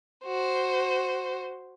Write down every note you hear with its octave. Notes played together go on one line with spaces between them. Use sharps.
F#4 C5